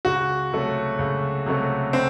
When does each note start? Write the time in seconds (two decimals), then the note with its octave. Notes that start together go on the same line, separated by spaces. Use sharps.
0.05 C#2 F#4
0.52 C3 F#3 A3
0.99 C#2
1.46 C3 F#3 A3
1.93 C4